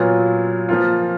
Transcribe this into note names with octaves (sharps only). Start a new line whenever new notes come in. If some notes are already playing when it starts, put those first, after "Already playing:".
Already playing: A#2 F#3 B3 F4
F3 A#3 F4